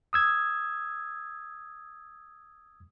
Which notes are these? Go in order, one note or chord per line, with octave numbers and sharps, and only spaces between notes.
D#6 E6 G#6